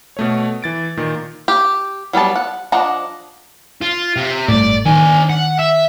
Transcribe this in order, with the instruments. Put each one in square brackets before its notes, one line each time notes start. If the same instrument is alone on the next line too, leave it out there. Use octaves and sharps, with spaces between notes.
[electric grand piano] B2 A3 C#5
E3 A6 D7
A#2 D#3
[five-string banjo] G4
F#3 G3 B3 A5
F#5
F3 D4 D#5 F#5 A#5
[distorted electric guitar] F4
C3
[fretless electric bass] G1 A2 [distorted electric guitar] D5
[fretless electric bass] D#3 [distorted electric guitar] D4 G#5
[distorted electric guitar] F#5
E5